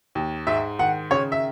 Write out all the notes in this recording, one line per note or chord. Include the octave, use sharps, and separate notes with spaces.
D#2
G#2 E5
D#3 F#5
C#3 C#5
E5